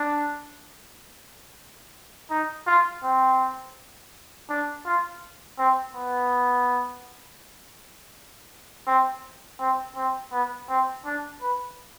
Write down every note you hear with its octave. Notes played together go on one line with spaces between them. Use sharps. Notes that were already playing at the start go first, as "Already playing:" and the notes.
Already playing: D4
D#4
F4
C4
D4
F4
C4
B3
C4
C4
C4
B3
C4
D4
B4